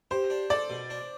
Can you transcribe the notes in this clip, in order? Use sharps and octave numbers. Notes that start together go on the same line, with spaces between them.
G4 C5
D4
A4 D5
B2
D4